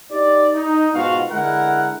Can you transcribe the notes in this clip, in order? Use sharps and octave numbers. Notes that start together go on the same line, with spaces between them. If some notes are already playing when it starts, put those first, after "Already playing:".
D#4 G4 D5
D#4
G#2 B2 F4 F#4 F5
D3 G#3 E4 A#4 F#5